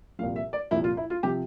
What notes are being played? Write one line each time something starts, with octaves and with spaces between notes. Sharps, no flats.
C2 A#2 F3 F5
E5
D5
C2 A#2 F3 E4
F4
E4
F4
C3 F3 G4